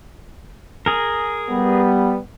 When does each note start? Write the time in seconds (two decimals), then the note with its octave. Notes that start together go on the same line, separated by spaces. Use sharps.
0.86 G#4 A#4
1.49 G3 B3